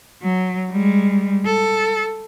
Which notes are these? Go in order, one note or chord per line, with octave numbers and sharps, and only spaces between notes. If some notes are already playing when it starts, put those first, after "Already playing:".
F#3
G3 G#3
A4